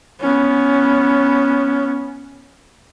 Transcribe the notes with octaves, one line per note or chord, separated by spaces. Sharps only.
B3 C#4